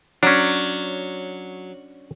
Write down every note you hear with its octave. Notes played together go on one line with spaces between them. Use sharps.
F#3 C#4 D4